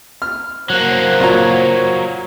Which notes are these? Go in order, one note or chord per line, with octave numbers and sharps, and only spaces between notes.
F6
F#3 A#3 A#4 C5 F#5
A#2 F#4 C#5 A#5